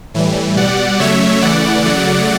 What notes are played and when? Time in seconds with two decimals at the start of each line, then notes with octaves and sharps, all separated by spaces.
0.14 A2 E3 G3
0.56 B2 G3 D5 F#5
0.99 C#3 F#3 A3 C#5 E5
1.42 C#3 E3 A3 D5 F#5
1.85 C#3 F#3 A3